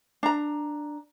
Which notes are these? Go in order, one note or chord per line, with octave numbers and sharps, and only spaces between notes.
D4 A#5